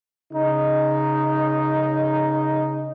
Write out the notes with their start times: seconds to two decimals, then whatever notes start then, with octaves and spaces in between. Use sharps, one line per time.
0.33 C#3 D#4